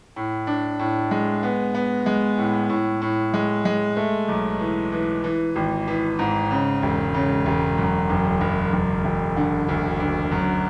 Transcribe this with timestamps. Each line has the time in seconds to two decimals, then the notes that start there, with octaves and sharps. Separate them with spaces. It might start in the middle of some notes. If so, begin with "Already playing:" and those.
0.16 A2
0.47 D4
0.79 A2
1.11 G#3
1.43 B3
1.75 B3
2.06 G#3
2.38 A2
2.70 A2
3.02 A2
3.34 G#3
3.65 G#3
3.97 A3
4.28 B1
4.60 E3
4.92 E3
5.24 E3
5.55 G#1
5.87 E3
6.19 G#2
6.51 C#3
6.82 E1
7.14 C#3
7.46 E1
7.78 F#2
8.10 F#1
8.41 F#1
8.73 F#1
9.05 E1
9.36 D3
9.68 D2
10.00 D2
10.31 F#2